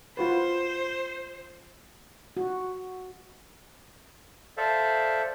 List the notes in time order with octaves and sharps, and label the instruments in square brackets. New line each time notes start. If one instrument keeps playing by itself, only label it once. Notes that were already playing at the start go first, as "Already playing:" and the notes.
[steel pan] F4 F#4 B4 [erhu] C5
[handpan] F#4
[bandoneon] A4 C5 D5 E5 F5